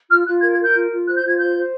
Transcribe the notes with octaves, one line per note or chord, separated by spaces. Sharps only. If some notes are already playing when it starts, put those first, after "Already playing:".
F4 F6
F4 F#6
A#4 G#6
G#6
A#4
G6
F4
F4
C5 F#6
G6
F4
G#6
C5 G6
C5